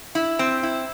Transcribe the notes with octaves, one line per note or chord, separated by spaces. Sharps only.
E4
C4
E4